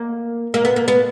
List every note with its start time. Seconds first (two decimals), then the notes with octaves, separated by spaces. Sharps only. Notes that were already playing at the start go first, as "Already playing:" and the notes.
Already playing: A#3
0.54 A#3
0.65 B3
0.76 A#3
0.88 B3